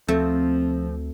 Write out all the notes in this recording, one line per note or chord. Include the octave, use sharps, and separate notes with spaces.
D2 F3 A3 C4